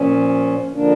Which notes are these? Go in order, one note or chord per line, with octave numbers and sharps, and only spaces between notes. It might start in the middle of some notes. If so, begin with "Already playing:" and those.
Already playing: A#2 F3 C#4
D3 F3 A#3 D4